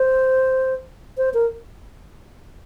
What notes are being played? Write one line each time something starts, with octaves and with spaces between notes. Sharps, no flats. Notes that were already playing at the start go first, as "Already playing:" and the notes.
Already playing: C5
C5
A#4